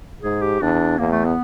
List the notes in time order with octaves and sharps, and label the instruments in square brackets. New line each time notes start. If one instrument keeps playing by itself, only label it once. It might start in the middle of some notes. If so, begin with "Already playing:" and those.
[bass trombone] G#2 [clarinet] G#4
[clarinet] G4
[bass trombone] E2 [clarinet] D4
[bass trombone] E2 [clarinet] A#3
[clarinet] A3
B3